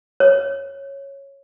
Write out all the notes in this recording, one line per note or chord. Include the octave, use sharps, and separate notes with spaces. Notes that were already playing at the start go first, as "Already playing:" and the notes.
C#5